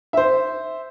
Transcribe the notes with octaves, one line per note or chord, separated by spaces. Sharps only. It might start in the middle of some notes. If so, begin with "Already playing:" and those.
C5 E5